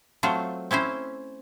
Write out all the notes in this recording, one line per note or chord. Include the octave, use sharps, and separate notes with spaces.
F#3 A3 C4 F4 C5
C4 C#4 E4 C5